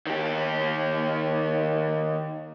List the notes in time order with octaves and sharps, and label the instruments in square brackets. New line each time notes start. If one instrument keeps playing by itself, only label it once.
[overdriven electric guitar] D#3 G4